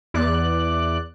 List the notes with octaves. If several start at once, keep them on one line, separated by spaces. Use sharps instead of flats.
E2 D5 F#6